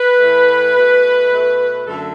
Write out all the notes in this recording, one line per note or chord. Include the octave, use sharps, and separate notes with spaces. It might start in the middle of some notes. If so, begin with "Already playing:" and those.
Already playing: B4
A2 E3 A3
B2 A3
B2 A3
F#2 D3 A3 A4